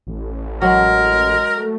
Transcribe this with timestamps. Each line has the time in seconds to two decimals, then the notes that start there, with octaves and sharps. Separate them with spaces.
0.07 A1
0.62 F#3 G#3 A#4
1.57 A3